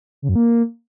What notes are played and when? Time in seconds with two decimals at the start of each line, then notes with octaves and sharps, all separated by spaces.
0.22 C#3
0.29 F#2
0.35 A#3